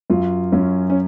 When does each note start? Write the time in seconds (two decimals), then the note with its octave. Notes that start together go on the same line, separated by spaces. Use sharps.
0.10 F#2 F4
0.52 F#2 C#4
0.90 C#4